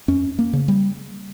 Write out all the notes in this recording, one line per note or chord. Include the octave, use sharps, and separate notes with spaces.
F2 C#4
A#3
C#3
G3